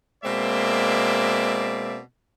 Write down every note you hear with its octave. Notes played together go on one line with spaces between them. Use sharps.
B2 G#3 A#3 C4 D5 E5